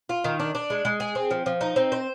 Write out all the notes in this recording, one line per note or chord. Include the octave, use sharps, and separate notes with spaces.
F4
D#3
D4
D4
G#3
G#3
G#4
C4
F3
F3
D#4
C4
C5